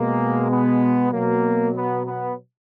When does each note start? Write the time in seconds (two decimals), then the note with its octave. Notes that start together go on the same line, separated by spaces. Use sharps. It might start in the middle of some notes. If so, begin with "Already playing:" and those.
Already playing: B2 G#3 A#3
0.51 B3
1.12 B2 F#3 A#3
1.75 B3
2.06 B3